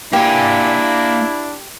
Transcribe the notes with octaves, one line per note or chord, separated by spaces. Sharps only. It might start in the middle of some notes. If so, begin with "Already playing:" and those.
A#3 D4 E4 G4 G#5